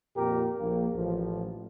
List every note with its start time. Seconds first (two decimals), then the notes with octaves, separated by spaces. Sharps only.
0.17 F2 A#2 G4 A#4
0.59 A#1 A#3
0.96 A1 F3